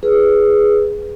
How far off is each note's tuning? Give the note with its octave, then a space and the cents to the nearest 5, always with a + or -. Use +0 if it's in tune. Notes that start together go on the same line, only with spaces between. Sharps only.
G#4 +0 B4 +0